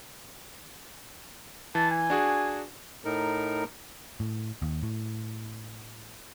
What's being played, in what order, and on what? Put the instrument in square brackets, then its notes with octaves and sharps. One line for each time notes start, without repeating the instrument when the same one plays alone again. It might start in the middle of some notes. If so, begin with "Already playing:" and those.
[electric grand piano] E3 [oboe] A5
[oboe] G#5
[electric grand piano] D4 F#4 G#4
[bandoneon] A2 D#4 A#4
[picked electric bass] A2
D#2
A2